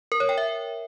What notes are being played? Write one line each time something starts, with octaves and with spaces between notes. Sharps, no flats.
A#4
C#5
G5
E5